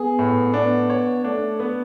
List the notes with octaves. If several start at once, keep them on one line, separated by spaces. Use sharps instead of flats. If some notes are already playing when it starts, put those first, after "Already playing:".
Already playing: B3 G#4
A2
B3 D4
C#5
A3 D4
B3